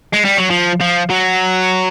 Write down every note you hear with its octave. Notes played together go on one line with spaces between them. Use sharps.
G#3
G3
F#3
F3
F3
F#3